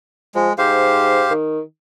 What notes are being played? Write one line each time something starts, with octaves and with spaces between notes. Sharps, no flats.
F3 G#3
G#2 G4 C5 F5
D#3